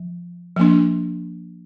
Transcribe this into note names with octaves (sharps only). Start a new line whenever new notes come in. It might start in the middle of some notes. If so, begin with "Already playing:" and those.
Already playing: F3
F3 A#3 D4